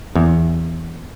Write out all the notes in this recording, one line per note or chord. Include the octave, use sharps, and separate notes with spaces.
E2